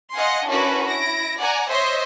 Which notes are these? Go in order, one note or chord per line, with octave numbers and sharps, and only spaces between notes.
D#5 F5 F#5 G#5 C6
C#4 D4 E4 F#4 A#4 B4
E4 A#6 D7
D5 F#5 G#5 A#5
C5 C#5 D#5 E5 C6